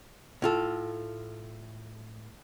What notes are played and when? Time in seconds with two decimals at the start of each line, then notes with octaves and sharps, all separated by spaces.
0.42 A2 F4 A4